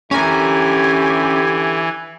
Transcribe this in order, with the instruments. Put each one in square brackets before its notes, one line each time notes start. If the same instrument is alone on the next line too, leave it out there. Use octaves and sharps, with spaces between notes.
[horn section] D3 E4 G4 [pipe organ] E3 [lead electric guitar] C#4 A#4 [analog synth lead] G#5